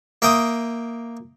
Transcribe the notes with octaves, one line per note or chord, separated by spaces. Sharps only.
A#3 E5 G5 D#6